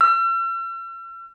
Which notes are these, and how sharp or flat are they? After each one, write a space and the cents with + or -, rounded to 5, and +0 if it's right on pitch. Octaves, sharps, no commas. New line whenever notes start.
E6 +45